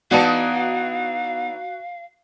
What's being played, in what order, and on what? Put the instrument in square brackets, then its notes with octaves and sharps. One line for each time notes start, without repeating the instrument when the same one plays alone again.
[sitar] E3 D#4 D5 [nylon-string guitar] B3 F#5 A5 [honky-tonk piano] F#4 [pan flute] F5